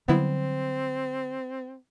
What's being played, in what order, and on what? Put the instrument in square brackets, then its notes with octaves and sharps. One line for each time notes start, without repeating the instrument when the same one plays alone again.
[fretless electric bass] D3 F#3 G3 [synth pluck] B3 E4 [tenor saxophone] C4